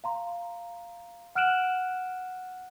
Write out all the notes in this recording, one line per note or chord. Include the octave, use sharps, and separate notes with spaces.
F5 A#5 C6
F#5 F6 F#6 D7 E7 F#7